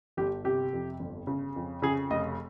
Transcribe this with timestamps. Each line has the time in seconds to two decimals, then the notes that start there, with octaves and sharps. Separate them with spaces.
0.17 G1 G4
0.44 C3 G4
0.73 F2
1.00 G1
1.27 C#3
1.56 F2
1.82 C#3 G#4
2.11 F1 D#5